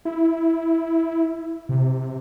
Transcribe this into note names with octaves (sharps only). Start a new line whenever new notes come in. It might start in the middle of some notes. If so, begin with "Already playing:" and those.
E4
C3